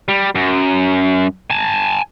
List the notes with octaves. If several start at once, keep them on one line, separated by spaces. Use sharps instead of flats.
G3
F#2
G#5 A5